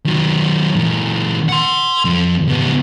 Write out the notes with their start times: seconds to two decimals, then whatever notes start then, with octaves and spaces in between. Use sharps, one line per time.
0.06 D#3 F#3
0.76 A#2 E3
1.49 F#5 C6
2.05 F2
2.48 C#2 B3